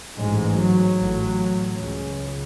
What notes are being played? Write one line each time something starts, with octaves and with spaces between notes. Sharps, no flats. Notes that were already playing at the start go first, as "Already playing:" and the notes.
A1 G#2 G#3
F#3
A1 A2
C#2 C#3